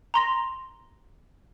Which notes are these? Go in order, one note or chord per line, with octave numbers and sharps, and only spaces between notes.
A#5 C6 A#6